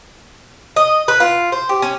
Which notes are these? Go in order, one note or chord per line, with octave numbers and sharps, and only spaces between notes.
D#5
B4
F4
C5
G4
C#4